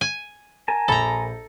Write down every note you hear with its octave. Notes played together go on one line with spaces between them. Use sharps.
G#5
A#4 G#5 A5
A#1 A4 A#5 B5